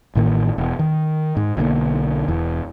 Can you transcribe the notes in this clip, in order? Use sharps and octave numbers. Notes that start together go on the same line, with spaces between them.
A1 A2 D#3 A#3
E1
D#3
G#2
B1 D3 G3 A#3
E1 E2